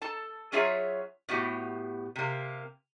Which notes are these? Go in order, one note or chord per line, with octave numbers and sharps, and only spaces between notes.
A4 A5
F#3 C#4 F4 G#4 C#5 E5
A2 B3 F#4 G4
C3 A#3